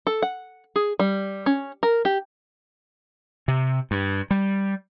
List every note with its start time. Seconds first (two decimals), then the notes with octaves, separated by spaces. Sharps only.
0.07 A4
0.22 F#5
0.76 G#4
0.99 G3
1.46 C#4
1.83 A#4
2.05 G4
3.48 C3
3.91 G2
4.31 G3